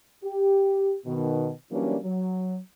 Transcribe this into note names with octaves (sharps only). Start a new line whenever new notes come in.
G4
B2 D#3
E3 F#3 G3 A#3 C#4 D4
F#3